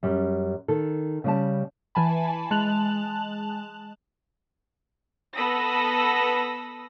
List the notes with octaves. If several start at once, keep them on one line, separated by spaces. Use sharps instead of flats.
F#2 G3
D#3 A4
C#3 G3 A5
E3 G#5 A5 B5
G#3 A5 F#6 F7 F#7
B3 A4 B5 D#6 E6 A#6